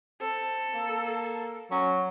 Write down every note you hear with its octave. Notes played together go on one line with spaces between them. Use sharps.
C4 A4
A#3
F#3 C#4